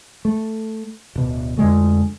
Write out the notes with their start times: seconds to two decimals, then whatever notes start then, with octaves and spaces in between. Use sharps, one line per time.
0.25 A3
1.16 D1 B2
1.57 F2 D3 G#3 A3